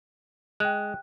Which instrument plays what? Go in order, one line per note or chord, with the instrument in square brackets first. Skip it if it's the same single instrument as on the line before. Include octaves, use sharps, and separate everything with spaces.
[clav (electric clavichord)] G#3 [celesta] G5 F#6